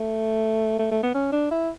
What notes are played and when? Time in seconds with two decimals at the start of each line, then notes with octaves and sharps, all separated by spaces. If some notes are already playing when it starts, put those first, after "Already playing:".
Already playing: A3
0.79 A3
0.91 A3
1.03 B3
1.15 C#4
1.32 D4
1.51 E4